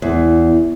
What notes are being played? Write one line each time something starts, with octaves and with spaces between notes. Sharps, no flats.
E2